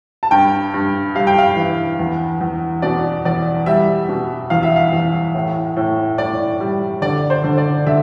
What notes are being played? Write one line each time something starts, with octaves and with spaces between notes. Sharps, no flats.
A5
G2 G5
G2
G3 F5
G5
F5
E3
E2
E2
B2 D5
E2 D5
G3 E5
B2
E2 F5
E5
F5
E2
A2
A2
A2 D5
G3
D3 D5
C5
D3
D5
D3 E5